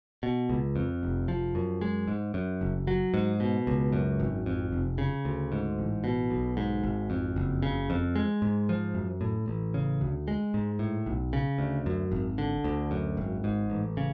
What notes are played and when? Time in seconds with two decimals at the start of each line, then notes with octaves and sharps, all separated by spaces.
0.23 B2
0.49 C#2
0.76 F2
1.03 F1
1.28 F3
1.55 F#2
1.81 G#3
2.08 G#2
2.34 F#2
2.61 F#1
2.87 F#3
3.14 G#2
3.40 B2
3.67 C#2
3.93 F#2
4.20 G#1
4.46 F2
4.73 F1
4.98 C#3
5.25 D2
5.52 G#2
5.79 A1
6.04 B2
6.30 B1
6.57 G#2
6.83 G#1
7.10 F2
7.36 F#1
7.63 C#3
7.90 F2
8.16 G#3
8.42 G#2
8.69 F3
8.94 F#2
9.21 A2
9.48 A1
9.74 C#3
10.01 D2
10.28 G#3
10.54 G#2
10.79 A2
11.06 B1
11.33 C#3
11.59 D2
11.86 F#2
12.12 G#1
12.38 D3
12.64 D2
12.91 F#2
13.17 G#1
13.44 G#2
13.70 A1
13.97 C#3